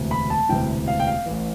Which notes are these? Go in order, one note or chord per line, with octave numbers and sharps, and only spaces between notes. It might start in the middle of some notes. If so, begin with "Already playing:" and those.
Already playing: E1 D2 C3 E3
B5
A5
E1 D2 C3 E3 G5
F5
G5
F5
A1 A2 E3